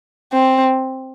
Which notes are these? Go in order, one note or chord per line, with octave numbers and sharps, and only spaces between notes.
C4